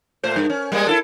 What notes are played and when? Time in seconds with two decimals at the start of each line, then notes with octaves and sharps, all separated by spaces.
0.23 A#2 A3 C5
0.36 G2
0.50 C#4
0.72 G3 G#3 A#3
0.87 E4 F4 A4